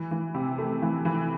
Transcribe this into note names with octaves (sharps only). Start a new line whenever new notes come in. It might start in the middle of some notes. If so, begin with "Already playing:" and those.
Already playing: E3
E3
C3
A3
E3
E3